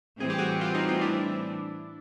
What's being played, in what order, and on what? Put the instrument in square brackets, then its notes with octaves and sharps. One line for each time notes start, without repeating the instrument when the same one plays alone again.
[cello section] A2 E3 G3 C4 [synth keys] G#4
[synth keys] G4
F#4 G#4
F4 G4
D#4 F4
D#4 F4
D4 E4